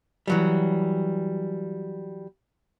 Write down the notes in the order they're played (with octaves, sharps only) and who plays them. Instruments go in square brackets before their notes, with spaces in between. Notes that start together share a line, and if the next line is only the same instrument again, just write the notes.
[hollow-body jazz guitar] E3 F#3 G3